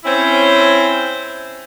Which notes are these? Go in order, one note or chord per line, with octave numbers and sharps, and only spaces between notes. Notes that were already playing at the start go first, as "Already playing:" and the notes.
C4 C#4 E4 C5 C#5